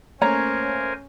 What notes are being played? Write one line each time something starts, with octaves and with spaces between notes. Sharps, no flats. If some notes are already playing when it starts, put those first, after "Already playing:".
A3 A#3 C#4 A#4 C5 C#5 G#5 A#5